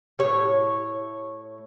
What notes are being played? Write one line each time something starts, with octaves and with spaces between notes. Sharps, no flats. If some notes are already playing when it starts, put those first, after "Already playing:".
A2 G3 C#5